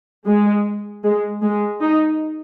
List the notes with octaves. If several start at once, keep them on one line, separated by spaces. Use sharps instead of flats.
G#3
G#3
G#3
D#4